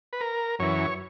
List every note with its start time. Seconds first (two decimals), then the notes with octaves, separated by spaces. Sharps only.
0.13 B4
0.21 A#4
0.59 F#2 E3 C#5